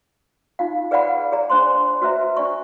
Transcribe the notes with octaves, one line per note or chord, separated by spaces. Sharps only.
D#4 F4 F5
G#4 B4 D5 F5 F#5 B5
G#4 D5 A#5
D4 C5 C6
F#4 B4 C5 E5 A#5
D4 D5 C#6